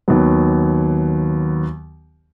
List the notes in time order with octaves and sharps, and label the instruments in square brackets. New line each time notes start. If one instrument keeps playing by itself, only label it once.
[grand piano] D#2 D#3 F#3 B3